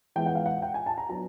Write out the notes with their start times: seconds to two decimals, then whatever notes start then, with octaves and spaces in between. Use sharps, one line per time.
0.16 E3 G#3 B3 G5
0.26 F#5
0.35 F5
0.46 F#5
0.62 G5
0.74 G#5
0.86 A5
0.98 A#5
1.09 F#3 B3 D4 A#5